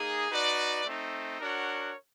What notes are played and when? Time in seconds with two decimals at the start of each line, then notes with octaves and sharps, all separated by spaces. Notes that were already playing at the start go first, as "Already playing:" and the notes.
Already playing: A#3 D#4 G#4
0.30 D#4 F#4 B4 D5
0.84 A3 C4 D#4
1.40 D4 F#4 A#4 C#5 F#5